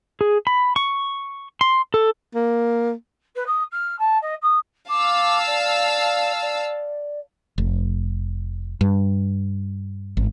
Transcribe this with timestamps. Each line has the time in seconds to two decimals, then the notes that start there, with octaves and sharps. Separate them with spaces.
0.21 G#4
0.47 B5
0.76 C#6
1.61 C6
1.94 A4
2.35 A#3
3.35 B4
3.46 D#6
3.71 F6
3.99 A5
4.22 D#5
4.42 D#6
4.89 F5 A5 D6 E6
5.47 D5
6.42 D5
7.58 F1
8.81 G2
10.17 G#1